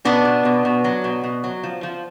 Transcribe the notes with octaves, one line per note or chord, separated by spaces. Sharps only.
B2 B3 D4
B2
B2
B2
F#3
B2
B2
F#3
F3
F3